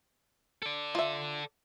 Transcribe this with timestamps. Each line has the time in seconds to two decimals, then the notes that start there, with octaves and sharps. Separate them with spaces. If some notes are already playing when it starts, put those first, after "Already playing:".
0.62 A4 D5
0.95 F4 E5